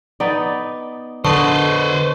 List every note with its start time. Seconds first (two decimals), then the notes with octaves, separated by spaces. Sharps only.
0.20 B3 D#4 D5
1.25 D3 D4 A4 B4 C5 D#5 C#6